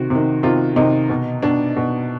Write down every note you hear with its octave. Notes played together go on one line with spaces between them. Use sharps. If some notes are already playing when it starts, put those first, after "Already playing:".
Already playing: C3 D#3 F#4
C3 D#3
C3 D#3 F4
C3 D#3 D#4
B2
B2 D4
B2